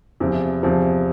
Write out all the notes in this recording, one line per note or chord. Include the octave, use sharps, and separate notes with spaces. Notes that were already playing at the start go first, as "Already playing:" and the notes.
E2 C3 F3
E2 C3 F3